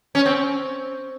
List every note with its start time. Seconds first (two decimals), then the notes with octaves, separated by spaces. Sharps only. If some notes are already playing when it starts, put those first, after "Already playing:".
0.15 C#4
0.26 C4